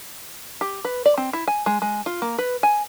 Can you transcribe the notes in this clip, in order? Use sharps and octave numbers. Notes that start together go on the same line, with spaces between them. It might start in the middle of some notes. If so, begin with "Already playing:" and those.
G4
B4
D5
C4
E4
G#5
G#3
G#3
F4
A#3
B4
G#5